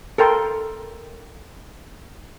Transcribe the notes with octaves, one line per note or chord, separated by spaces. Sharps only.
A4 A#4 G5 C6